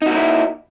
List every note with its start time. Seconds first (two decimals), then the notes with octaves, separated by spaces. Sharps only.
0.02 D#4
0.06 F#4
0.11 A#3
0.16 E4